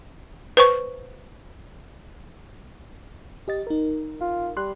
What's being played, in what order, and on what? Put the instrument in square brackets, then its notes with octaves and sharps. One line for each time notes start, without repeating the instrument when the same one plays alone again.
[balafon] B4 C5 C#6
[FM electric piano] G4 D#5 A6
D#4 A#4
[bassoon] F4
[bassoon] G3 [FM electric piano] C6 F#6